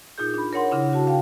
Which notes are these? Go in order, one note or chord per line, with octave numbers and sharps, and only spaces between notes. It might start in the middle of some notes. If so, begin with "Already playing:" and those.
A#2 D#4 F4 G#4 G6
D4 B5
A#4 C#5 F#5 C6
C#3 D4 E4
F#4 A5
F5 G5